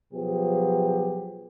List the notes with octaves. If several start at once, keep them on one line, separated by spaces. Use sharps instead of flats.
B2 F3 F#3 B3 G4 G#4